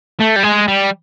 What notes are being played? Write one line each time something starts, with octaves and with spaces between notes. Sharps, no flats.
A3
G3
G#3
G3